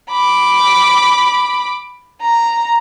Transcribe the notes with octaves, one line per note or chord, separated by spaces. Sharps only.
B5 D6
A#5